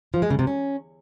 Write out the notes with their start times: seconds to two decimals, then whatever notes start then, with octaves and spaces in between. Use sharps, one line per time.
0.14 F3
0.22 G#3
0.30 C#3
0.39 C3
0.47 C#4